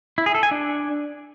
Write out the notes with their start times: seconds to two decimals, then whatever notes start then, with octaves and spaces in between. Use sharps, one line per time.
0.18 E4
0.26 G#4
0.35 A4
0.43 G#5
0.51 D4